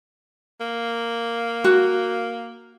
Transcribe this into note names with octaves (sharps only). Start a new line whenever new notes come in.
A#3
F#4